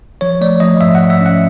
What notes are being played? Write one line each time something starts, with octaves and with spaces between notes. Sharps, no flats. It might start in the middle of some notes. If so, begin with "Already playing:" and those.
F3 C#5
A3 D5
F3 D#5
G#2 E5
F#5
G#2
E5
C#4 F#5